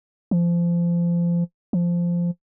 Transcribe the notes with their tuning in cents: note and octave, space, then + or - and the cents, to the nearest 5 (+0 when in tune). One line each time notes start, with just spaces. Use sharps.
F3 -25
F3 -10